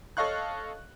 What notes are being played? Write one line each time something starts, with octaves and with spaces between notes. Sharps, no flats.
A4 C#5 D#5 F5 C#6 F#6